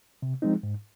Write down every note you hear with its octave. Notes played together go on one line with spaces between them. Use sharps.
C3
F3 G#3 C4 D#4
G#2